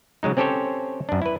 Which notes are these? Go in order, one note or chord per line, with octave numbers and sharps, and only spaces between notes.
C#3 F#3 G#3 D#4
C4 C#4 G4 A4 C5 C#5
F#2 D4
E4 B4